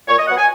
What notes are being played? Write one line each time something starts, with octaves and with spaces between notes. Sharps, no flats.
A#2 C#5
D#5
F#3 B3 F#5
G#5